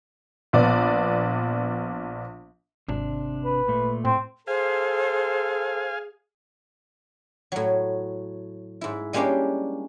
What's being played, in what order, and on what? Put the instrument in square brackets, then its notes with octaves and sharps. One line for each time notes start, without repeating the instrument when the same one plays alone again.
[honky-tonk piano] A#1 B3 D5
[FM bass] G#1 [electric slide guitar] C3 D4
[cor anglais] B4
[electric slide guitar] A#2 A3
[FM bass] A2 [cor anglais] C4
[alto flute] G#4 [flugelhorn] A4 [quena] C5 [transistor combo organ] F5 G#5
[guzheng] A2 F#3
G#2 E4
G3 G#3 A#3 C#4 D4 G4